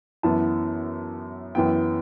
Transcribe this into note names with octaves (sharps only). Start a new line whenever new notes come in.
F#2 E3 B3 A5
F#2 E3 B3 G5